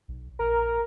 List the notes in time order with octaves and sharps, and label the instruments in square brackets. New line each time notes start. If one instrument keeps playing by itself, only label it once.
[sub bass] B1
[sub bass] A#1 [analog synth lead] A#4